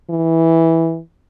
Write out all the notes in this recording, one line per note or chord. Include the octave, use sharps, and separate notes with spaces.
E3